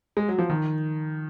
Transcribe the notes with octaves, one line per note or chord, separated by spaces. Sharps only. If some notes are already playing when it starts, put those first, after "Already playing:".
G#3
F#3
F3
D#3